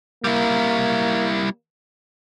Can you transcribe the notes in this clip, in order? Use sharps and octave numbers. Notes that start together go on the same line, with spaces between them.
G3 A#3 E4